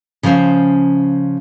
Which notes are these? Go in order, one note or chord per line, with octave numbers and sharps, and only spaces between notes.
C#3 F3 C#4 C5 E5